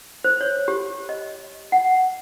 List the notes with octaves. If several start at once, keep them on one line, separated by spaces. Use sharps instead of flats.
C5
C#5
G4
D#5
F#5